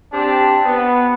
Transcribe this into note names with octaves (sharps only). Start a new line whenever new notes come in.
C4 D4 G4
B3